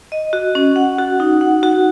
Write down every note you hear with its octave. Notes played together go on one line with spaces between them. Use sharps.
D#5
F#4
C#4
F#5
F#4
D#4
F#5
F#4